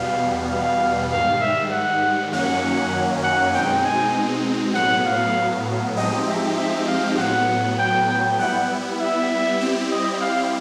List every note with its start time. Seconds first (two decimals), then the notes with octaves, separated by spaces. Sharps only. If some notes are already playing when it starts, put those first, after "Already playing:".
Already playing: E2 B2 G3 B3 F5
0.49 F5
1.10 G#2 D#3 G3 F5
1.41 E5
1.71 F#5
2.32 F#2 D#3 F#3 A#3 C#4 F#5
3.23 F#5
3.53 B2 G#3 C4 D#4 G5
3.84 G#5
4.75 A2 F#3 B3 F#5
5.06 F5
5.97 F3 G#3 C4 D#4 G4 D#5
6.26 E5
6.57 E5
6.87 F5
7.17 A2 F#3 B3 F#5
7.79 G5
8.09 G5
8.39 G3 B3 E4 F#5
9.00 E5
9.60 G3 C4 E4 G4
9.91 D#5
10.21 F5